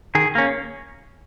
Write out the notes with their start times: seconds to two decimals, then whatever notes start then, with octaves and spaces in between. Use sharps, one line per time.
0.15 D#3 G#4
0.35 A#3 C#4